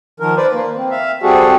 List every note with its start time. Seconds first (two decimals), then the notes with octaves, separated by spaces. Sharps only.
0.20 D#3 F3 A#4
0.37 B4 C5 D5
0.53 A#3
0.76 C4
0.91 E5 F5
1.23 G3 C4 F#4 G#4 A4